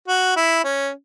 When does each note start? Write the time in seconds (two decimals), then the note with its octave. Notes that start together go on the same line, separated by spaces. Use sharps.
0.08 F#4
0.37 E4
0.64 C#4